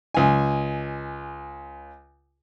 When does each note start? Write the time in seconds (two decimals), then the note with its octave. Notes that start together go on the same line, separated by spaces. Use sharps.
0.14 C#2 G#5